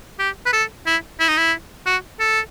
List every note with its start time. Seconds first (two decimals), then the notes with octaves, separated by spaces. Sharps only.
0.19 G4
0.46 B4
0.53 A4
0.86 E4
1.20 E4
1.29 D#4
1.38 E4
1.86 F#4
2.20 A4